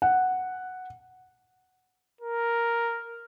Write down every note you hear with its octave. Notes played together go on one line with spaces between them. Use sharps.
F#5
A#4